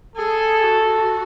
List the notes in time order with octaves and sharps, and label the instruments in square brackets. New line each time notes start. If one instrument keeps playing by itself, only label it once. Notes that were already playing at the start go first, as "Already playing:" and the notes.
[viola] G#4 [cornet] A4
[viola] F#4